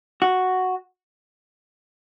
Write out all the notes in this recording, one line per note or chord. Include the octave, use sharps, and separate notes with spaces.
F#4